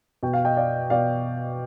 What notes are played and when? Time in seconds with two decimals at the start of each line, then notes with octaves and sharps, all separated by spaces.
0.23 B2 G5
0.33 F5
0.45 D#5 G5
0.57 D5 F5
0.90 B2 D5 F5